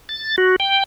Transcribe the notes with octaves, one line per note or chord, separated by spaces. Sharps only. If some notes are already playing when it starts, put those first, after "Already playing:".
A6
F#4
G5